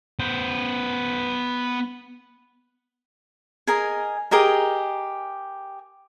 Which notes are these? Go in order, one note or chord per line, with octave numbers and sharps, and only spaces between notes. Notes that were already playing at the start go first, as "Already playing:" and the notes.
B3 C5
G#4 A#4 D#5 G#5
G4 G#4 A#4 D#5